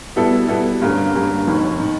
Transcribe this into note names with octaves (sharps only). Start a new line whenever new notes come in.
B2 G3 B3 E4 A4
B2 G3 B3 E4 A4
G2 D3 G3 A#3 C#4
G2 D3 G3 A#3 C#4
F1 D#2 D#3
D#3